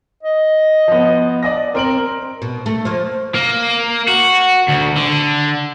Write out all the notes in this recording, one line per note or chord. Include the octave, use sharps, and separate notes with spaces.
D#5
F3 B3
D5 D#5 A#6
C4 A#4 D7 F#7
B2
A3
F3 A#3
A#3
F#4
D2
D3